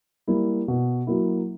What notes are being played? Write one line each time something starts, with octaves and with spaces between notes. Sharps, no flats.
G3 A#3 E4
B2
F#3 A#3 E4